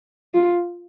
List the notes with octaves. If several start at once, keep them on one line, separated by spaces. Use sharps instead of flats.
F4